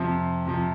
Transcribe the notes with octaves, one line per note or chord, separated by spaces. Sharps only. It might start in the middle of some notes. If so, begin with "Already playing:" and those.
Already playing: F2 C3 F3
F2 C3 F3